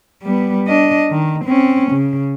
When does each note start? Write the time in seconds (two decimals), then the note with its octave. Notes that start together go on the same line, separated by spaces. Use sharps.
0.23 G3 B3
0.68 D4 D#5
1.11 D#3
1.45 C4 C#4
1.92 C#3